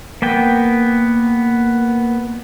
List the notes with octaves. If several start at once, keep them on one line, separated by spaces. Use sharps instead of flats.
A#3 B3 G5